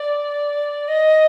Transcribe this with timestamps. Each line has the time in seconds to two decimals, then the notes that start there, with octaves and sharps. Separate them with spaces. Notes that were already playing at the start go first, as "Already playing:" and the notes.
Already playing: D5
0.88 D#5